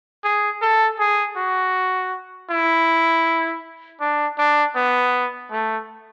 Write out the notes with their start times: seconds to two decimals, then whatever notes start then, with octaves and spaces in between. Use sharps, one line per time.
0.24 G#4
0.62 A4
0.99 G#4
1.37 F#4
2.50 E4
4.00 D4
4.38 D4
4.76 B3
5.51 A3